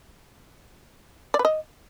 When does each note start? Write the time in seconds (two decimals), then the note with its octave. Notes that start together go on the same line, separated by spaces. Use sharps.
1.34 D5
1.39 B4
1.45 D#5